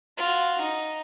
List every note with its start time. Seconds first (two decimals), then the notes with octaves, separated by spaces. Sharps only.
0.17 F4 F#4
0.61 D#4